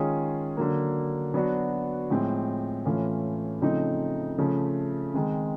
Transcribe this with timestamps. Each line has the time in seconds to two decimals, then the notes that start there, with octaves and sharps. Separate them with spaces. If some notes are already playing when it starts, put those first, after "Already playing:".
Already playing: D#3 G#3 C#4 F4 G#4
0.57 D3 F#3 A#3
1.34 F#3 B3 D4 F#4
2.10 A2 F3 G#3 C4
2.85 A2 E3 A3 C#4 F4
3.61 C#3 F3 A3 C4 D#4
4.38 C#3 F3 A3
5.14 D#3 G#3 C4